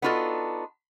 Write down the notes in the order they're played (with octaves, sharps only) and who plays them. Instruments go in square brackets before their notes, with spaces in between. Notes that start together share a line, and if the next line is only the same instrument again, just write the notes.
[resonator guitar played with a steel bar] B3 D4 D#4 F4 F#4 A4